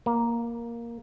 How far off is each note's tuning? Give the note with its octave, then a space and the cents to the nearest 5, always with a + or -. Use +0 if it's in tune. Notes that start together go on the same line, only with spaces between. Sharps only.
A#3 +5